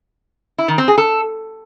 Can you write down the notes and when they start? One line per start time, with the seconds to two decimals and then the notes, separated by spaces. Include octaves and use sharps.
0.58 E4
0.68 D#3
0.78 C4
0.88 G#4
0.98 A4